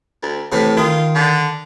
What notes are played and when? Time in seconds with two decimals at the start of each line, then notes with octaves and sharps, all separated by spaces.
0.22 D2
0.52 A2 C3 E3 A3
0.77 D#3 F4 D#6
1.15 D3